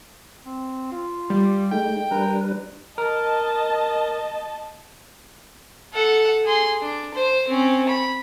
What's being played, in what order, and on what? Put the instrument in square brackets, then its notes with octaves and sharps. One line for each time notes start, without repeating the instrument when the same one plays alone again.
[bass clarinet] C4
F4
[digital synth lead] G3
[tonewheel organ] G#3 A3 D#4 [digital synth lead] G5
[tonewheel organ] G3 D4 B4 [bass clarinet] A#4
[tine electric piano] A#4 [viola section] D#5 A5
[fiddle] A4 F#5
G#4 C6
D4
C5
C4 C#4
B5